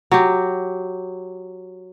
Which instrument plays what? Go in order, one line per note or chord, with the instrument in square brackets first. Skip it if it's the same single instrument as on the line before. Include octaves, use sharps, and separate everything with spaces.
[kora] F#3 G4